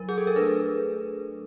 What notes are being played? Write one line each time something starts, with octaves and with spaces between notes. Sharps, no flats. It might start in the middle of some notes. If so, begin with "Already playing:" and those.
Already playing: F#3 A#4
G#4
A4
A#4
A3 D4 B4